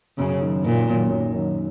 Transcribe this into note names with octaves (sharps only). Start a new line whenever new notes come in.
F#2 C#3
D#3 F#3
F#2 A#2
D#3 F#3
F#2
D#3 F#3